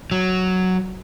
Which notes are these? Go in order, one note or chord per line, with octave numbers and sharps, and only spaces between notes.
F#3